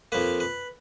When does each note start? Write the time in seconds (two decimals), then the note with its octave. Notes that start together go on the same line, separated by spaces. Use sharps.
0.12 F2 F3 A#3 B4
0.40 B4